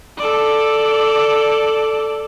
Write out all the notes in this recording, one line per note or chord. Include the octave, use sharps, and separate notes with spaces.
A4 D5